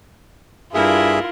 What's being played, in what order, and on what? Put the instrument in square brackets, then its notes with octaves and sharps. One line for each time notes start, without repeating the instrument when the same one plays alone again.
[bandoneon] G2 G#4 E5 [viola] E4 A#4 [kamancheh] F4